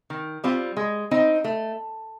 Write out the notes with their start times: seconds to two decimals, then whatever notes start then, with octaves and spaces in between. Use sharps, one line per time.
0.10 D#3
0.44 G3 C4 F4
0.77 G#3
1.11 C4 D#4
1.44 A3